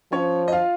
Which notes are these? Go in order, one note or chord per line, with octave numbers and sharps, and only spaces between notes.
F3 C#4 C#5
D#5
F4 F5